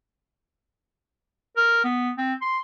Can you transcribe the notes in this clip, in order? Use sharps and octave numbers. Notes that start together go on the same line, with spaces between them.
A#4
B3
C4
C6